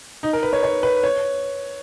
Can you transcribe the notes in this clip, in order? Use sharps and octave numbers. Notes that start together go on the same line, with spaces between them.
D#4
A#4
B4
C#5
C#5
B4
C#5